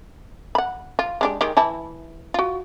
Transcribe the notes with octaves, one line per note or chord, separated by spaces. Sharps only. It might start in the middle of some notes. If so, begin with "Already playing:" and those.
F#5 B5
F4
G#3 D4 G4
D#3 G#3 G4
E3 E4 A5
F4 F#4